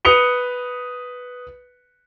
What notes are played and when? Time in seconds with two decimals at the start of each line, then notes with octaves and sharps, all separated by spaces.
0.05 B4 D#6 C#7 F7 G7